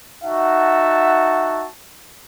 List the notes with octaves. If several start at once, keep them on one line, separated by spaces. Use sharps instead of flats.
D#4 F#4 E5 F#5 A5